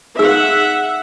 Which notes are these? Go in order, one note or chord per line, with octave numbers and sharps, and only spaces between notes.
D#4 G#4 E5 F#5 E6